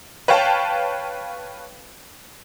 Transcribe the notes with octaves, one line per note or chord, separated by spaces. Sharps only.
B4 C#5 F5 G5 A5